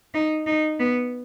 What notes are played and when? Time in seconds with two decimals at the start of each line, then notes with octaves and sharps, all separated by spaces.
0.14 D#4
0.46 D#4
0.79 B3